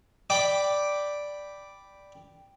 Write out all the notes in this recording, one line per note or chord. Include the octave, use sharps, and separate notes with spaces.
D5 G5 B5 D6